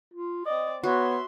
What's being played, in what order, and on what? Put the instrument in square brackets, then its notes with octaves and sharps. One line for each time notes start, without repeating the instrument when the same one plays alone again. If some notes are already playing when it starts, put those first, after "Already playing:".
[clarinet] F4
[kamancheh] C4 D5 [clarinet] D#5
[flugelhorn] B3 [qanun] F#4 [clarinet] C#5 [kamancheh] E5 C6